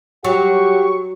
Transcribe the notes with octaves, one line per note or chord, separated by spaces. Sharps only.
F#3 G4 F#5 C#6